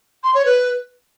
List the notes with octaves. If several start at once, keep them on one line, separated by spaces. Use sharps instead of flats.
C6
C#5
B4